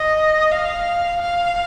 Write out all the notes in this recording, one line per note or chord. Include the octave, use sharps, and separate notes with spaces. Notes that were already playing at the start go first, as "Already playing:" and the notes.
Already playing: D#5
F5
F5